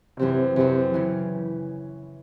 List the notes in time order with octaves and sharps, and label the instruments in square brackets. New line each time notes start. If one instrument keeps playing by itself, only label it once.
[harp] F#2 E3 C4 [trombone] C3
[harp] F#2 E3 C4 [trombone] C3
[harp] C#3 E3